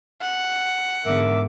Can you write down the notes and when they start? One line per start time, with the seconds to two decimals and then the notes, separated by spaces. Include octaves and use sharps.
0.21 F#5
1.05 E2 G#2 D3 A#4 E5 D6